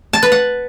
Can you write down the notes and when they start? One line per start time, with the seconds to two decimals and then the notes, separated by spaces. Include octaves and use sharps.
0.13 A5
0.23 B4
0.32 F#5